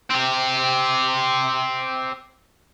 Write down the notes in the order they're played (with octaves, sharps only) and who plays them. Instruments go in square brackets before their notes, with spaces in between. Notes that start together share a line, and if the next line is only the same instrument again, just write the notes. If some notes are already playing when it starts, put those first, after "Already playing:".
[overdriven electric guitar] C4 G4